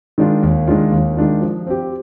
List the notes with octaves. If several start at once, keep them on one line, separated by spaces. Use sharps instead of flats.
D#3 G#3 D4 F4
D#2
D#3 G#3 D4 F4
D#2
D#3 G#3 D4 F4
F3
C4 G4